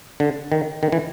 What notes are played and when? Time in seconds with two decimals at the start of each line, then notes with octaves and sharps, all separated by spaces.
0.20 D3
0.52 D#3
0.83 D#3
0.92 E3